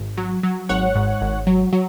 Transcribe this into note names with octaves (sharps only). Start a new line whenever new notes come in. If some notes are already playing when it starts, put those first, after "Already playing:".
Already playing: G#1
F#3
F#3
G#1 C#5 F#5
G#2
G#1
F#3
F#3